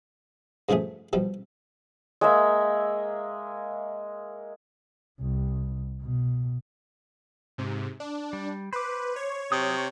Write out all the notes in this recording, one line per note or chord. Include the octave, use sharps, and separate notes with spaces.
G2 C#3 F3 A3 G#4
B2 F3 G3
G#3 A#3 E5
C2
B2
G#2 C3
D4
G3
B4 C5 D6
C#5
C3 F#3 D#6